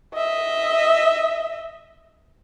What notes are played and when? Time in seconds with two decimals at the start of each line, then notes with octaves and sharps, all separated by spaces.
0.14 D#5 E5